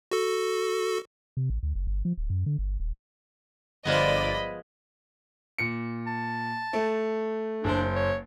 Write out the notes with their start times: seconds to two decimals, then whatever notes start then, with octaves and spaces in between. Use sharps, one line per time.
0.11 F#4 A4
1.37 C3
1.50 A1
1.63 D2
1.75 F#1
1.87 G1
2.05 F3
2.17 D1
2.30 F#2
2.46 D3
2.58 G1
2.80 D#1
3.85 G1 F3 G#3 B3 D5 D#5 B5
5.58 A#2 C#7
6.07 A5
6.73 A3
7.64 F#1 D4 C5
7.96 C#5